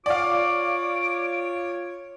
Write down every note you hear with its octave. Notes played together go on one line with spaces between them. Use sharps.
F4 C#5 D5 F5 D6